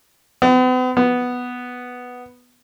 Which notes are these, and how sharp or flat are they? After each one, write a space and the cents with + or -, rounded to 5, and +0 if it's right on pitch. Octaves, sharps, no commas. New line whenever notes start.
B3 +45
B3 +0